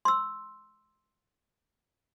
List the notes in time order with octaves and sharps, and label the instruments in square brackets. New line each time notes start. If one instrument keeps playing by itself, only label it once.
[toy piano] C6 E6